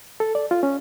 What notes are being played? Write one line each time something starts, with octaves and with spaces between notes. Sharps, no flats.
A4
D5
F4
C#4